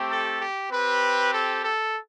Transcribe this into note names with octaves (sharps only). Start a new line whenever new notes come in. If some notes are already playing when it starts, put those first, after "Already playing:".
Already playing: A3 C4 G4
A4
G4
C4 G4 B4
A4
A4